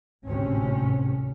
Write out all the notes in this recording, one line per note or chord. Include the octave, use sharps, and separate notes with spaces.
G#1 D2 A2 C3 C#4